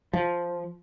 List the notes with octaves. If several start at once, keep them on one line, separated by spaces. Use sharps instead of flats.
F3